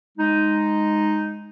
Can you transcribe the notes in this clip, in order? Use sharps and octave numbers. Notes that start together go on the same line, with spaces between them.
G#3 D#4